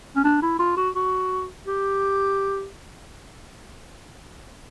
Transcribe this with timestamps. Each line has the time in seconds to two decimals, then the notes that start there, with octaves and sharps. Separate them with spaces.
0.16 C#4
0.24 D4
0.42 E4
0.59 F4
0.77 F#4
0.95 F#4
1.67 G4